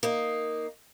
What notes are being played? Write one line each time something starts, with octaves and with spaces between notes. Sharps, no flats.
A#3 D#4